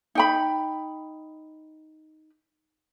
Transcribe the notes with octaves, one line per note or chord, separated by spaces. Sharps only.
D#4 G5 B5